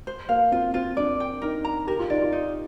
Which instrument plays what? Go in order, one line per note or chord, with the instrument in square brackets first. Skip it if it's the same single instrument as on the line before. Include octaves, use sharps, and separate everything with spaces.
[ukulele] C5
[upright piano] A#3 [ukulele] F5
[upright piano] C4 [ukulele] F4
[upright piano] C4 [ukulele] F4
[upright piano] D4 [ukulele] D5
[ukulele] G5
[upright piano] D#4 [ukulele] A#4
[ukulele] A#5
[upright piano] G4 [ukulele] A#4
[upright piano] F4
[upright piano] D#4 [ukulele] D5
[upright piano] F4
[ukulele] D#4